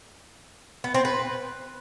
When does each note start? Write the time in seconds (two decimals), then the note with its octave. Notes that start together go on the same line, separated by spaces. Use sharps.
0.84 B3
0.94 C4
1.05 B4